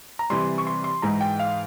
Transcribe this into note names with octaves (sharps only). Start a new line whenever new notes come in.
A#5
C3 E3 G3 C6
C#6
C6
C6
G#2 E3 G#3 A#5
G5
F5